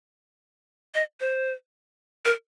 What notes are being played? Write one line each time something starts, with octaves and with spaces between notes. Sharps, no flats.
D#5
C5
A#4